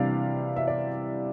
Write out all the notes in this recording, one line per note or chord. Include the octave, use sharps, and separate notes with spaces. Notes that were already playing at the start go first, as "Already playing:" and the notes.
Already playing: C3 E3 G3 D4 D5 F5
E5
D5